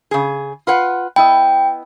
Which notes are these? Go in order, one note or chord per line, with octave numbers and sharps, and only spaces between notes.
C#3 G#4
F4 B4 F#5
B3 E4 D#5 G5